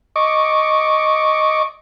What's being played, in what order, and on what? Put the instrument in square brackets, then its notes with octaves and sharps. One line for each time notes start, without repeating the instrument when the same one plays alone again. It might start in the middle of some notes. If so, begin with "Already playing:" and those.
[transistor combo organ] D#5 C#6 D6